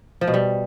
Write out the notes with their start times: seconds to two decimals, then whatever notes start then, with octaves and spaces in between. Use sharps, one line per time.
0.21 F3
0.27 B2
0.34 G3